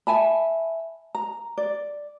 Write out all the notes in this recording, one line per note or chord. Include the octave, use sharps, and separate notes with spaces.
E5 G#5 A5 B5
A#5
D5